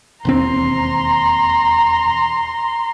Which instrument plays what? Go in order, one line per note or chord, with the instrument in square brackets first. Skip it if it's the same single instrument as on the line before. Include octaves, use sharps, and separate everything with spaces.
[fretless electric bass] E1 D#2 C4 [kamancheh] A#5 C6